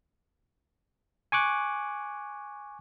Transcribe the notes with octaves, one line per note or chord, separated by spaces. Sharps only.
G#5 C#6 D6 F#6